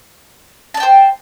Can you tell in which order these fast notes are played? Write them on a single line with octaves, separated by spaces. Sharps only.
A5 D5 G5 C5